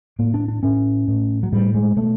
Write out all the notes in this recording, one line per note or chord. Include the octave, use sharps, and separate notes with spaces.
A2 A#3
D4
D4
A2 C#4
A2
F#3
A2 G3
G#3
B2 A3